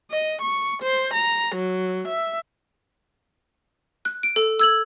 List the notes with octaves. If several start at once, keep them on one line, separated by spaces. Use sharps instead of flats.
D#5
C#6
C5
A#5
F#3
E5
F#6
D7
A4
E6 G#6 F#7